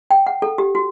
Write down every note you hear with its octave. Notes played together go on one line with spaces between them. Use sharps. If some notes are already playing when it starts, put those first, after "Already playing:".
G5
F#5
A4
G4
F#4